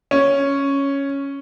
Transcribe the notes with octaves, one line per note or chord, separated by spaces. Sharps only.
C#4